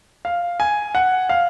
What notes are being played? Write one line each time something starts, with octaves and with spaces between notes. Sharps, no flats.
F5
G#5
F#5
F5